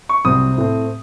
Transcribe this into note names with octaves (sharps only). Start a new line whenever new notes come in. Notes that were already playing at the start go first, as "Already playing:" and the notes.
C#6
C2 C3 F#3 C4 D#6
A2 A3 C4